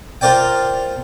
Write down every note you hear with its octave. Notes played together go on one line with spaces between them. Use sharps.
F4 A#4 C5 D5 G5